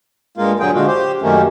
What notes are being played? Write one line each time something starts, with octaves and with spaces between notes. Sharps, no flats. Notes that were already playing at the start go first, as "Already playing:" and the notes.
G2 G#3 A#3 F4
G2 A#2 D3 F#3 G#4 G5
D3 G#3 F4 F#4
G4 C5
F#2 D#3 G3 A3 A#3 C#4